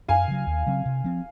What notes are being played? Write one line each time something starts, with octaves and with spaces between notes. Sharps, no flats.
F#2 F5 G#5
C#3 F#3
D#2
C#3 F#3 C4
C3
F3 C4